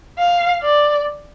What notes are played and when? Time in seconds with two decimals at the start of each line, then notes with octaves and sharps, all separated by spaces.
0.18 F5
0.63 D5